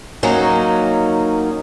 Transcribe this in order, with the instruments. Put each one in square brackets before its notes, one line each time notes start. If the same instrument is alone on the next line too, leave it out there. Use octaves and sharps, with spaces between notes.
[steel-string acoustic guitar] F#3 A#3 C#4 D#4